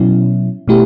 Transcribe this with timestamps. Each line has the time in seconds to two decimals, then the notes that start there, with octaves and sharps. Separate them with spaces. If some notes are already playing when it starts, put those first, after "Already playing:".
Already playing: B2 F#3 C#4 E4
0.68 B2 A3 E4 G4